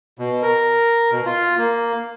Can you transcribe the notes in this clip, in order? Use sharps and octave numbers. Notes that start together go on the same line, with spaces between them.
B2
A#4
B2
F4
A#3